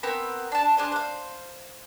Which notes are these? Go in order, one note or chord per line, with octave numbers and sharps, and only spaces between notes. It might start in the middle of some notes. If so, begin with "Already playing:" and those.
B3 C4 A#4 B5
D4 A5
D4 G#4 C5
C5 F5